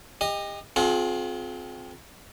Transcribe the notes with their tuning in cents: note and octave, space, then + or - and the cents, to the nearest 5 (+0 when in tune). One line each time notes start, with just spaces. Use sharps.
G4 +35 D#5 +0
C4 +0 F4 +35 G#4 +40